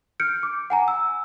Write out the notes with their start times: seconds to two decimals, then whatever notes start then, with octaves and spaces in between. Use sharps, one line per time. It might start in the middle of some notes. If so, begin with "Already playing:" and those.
0.20 F6 G6 C#7 D7
0.43 D6
0.70 F#5 G#5 A#5
0.88 E6